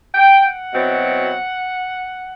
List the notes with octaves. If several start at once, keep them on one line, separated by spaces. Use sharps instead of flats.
G5
F#5
B2 F#3 C4 E4